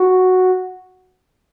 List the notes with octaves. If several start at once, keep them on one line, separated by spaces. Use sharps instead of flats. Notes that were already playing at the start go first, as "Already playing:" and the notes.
Already playing: F#4